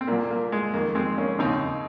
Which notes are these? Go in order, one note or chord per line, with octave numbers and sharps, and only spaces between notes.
C4
C2 A#2 A#3
A#3
G#3
F2 D#3 A#3
G#3 C4
A#3 C#4
D#2 C#3 C4 D#4